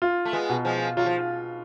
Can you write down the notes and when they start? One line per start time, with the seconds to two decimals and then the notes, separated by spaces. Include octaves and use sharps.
0.02 F4
0.25 A3
0.33 G#3 B3
0.49 B2
0.65 F3 G#3
0.97 F#3 F4
1.06 F3